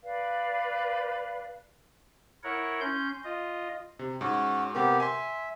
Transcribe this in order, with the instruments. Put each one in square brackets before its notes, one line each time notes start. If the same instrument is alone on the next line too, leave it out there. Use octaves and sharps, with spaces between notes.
[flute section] B4 D5 F5
[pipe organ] E4 A#4 C#5 F#5
C#4 C6 G6
F4 D#5
[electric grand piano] C3
[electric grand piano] G#2 [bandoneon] C#4 F#4
[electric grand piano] C3 A#4 [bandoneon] B3 G4
[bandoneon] E5 [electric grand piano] G#5 C6